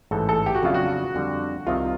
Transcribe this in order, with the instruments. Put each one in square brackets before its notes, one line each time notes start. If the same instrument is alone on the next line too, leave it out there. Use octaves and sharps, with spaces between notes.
[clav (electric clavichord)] A1 G#2 E3 [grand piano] A4
[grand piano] A4
G4
F#4
[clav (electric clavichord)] F2 C#3 F#3 B3 D4 [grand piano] F4
[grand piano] F#4
[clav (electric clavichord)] F2 D3 G3
[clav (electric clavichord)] C2 C3 D#3 [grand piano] F4